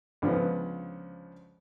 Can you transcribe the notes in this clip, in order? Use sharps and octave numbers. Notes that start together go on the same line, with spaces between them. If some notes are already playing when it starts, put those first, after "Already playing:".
C#2 D3 F3 B3